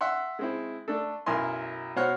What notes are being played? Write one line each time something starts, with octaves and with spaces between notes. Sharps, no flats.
E5 F#5 C6
G#3 C4 E4
A3 D4 A4
B1 F#2 E4 A#4 G#5 C6
B2 C5 C#5 F#5 F6